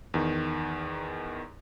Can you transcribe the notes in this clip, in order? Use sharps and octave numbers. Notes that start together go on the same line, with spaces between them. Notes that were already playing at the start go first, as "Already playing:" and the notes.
E2 D#3